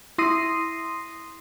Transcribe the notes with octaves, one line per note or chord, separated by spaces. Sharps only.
E4 C6 D#6 A#6 C7 D#7